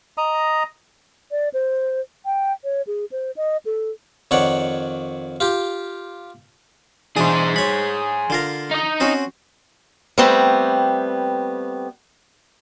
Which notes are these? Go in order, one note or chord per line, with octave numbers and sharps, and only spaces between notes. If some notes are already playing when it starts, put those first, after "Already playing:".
D#5 A#5 D#6
D5
C5
G5
C#5
G#4
C5
D#5
A4
F2 D#3 C#5 D5 F#5
F4 G4
B2 E3 D4 G#4 C5
C#5 B5
D3 F4 A#4
D#4 D#5
C4 C#4 F#4
G3 A3 B3 C4